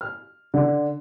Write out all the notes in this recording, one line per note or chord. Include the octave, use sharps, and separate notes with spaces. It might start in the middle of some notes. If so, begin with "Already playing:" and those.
F6
D3